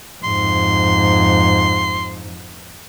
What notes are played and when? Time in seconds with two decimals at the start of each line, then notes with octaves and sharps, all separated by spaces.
0.24 F2 G#2 C6